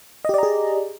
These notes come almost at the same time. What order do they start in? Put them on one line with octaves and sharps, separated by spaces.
D#5 G4 D5 A#5 G#4